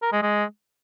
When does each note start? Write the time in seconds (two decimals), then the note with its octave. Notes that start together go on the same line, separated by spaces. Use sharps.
0.02 A#4
0.12 G#3
0.22 G#3